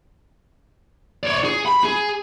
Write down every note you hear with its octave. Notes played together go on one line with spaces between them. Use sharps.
C#5 D5
G#4
B5
G#4